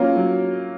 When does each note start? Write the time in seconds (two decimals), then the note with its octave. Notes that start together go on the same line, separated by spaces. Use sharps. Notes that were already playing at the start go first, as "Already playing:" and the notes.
Already playing: F#3 A#3 C#4 F4 A#4
0.16 F#3